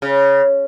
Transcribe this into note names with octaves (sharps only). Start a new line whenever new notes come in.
C#3